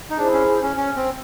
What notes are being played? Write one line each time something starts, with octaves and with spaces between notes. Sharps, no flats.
D#4
D4 E4 G#4 C5
C#4
C#4
C#4
C4